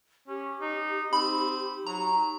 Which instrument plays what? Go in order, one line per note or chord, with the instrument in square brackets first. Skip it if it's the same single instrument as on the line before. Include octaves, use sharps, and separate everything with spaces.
[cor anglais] C#4 [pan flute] G4
[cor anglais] D#4
[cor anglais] C4 [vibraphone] D#4 [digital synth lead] B5
[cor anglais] F#3 [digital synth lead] A#5